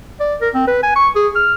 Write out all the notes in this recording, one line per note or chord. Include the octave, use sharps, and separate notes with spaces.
D5
A#4
C4
B4
G#5
C#6
G#4
F6